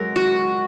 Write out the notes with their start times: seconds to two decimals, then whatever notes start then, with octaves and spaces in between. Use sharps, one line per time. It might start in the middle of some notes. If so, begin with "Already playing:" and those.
Already playing: F#3 G#3 A#4
0.16 F#4